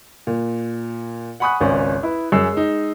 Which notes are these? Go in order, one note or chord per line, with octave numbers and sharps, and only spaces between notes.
A#2
F#5 G#5 B5 C#6 D#6 F#6
G#1 C#2 C#4 D5
E4 B4
F#2 G#4 E6 C7
G#3 D#4